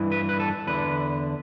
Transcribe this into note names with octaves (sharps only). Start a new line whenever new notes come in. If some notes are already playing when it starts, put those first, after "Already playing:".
Already playing: G2 E3
B4
B4
A4
E2 D3 B4